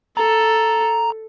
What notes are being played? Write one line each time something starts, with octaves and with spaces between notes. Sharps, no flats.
A4 A#5